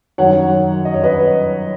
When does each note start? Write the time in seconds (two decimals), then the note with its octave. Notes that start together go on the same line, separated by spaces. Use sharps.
0.18 F#2 D#3 F#3 C#5 F#5
0.85 D#5
0.94 C#5
1.04 B4 D#5